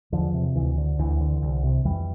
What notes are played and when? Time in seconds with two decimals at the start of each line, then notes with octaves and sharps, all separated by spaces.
0.12 E2 D3 F3
0.34 C3
0.55 D2 E3
0.77 D3
0.99 D2 E3
1.21 D3
1.42 C2
1.64 C3
1.85 F2 E3 G3